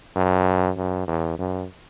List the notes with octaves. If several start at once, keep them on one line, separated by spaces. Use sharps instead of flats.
F#2
F#2
E2
F#2